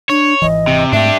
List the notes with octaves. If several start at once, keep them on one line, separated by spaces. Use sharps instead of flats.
D4 C#5
G#1 C#2 E3 D#5
C3
G#2 A3 C4 D4 G4 E5